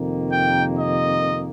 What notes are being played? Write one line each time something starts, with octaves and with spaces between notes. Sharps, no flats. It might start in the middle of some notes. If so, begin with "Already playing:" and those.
Already playing: F2 C3 D#3 A#3
G5
D#5